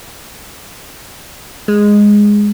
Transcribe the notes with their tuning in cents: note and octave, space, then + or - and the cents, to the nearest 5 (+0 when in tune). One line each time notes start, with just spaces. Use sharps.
G#3 -5